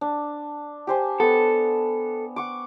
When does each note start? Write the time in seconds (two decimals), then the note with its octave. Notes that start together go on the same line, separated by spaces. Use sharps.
0.01 D4
0.87 G4 C5 G#5
1.20 B3 A4 F#5
2.36 F#5 C#6 D6